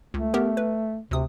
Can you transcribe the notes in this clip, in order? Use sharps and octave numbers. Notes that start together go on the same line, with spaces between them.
C#2 A3
B3 G4 A#4
B4
D2 C3 D#6